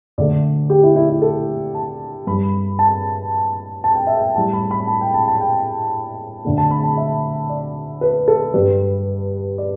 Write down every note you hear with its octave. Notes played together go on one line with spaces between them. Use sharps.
D2 D3 A3 D5
G4
E4
E4
E4
A4
A5
G2 G3 B5
A5
A5
G5
E5
G5
A2 G3 A5
B5
B5
A5
G5
A5
A5
G5
D2 D3 A3
A5
B5
A5
E5
D5
B4
A4
G2 G3 B4
D5